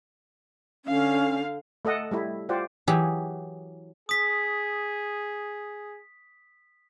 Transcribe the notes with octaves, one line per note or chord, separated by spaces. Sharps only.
D3 C#4 F5
A3 A4 D#5 F#5
G3 A3 E4
F4 G4 C5 D5 F#5
E3 F#3 G4 G#4
G#4 D#6 B6